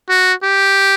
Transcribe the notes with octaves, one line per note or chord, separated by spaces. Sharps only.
F#4
G4